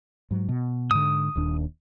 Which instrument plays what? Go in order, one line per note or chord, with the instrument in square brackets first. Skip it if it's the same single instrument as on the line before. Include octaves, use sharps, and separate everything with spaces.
[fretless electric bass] G#2 F#3
B2
[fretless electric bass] G#2 D3 [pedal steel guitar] D#6
[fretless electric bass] D#1 D#2 D4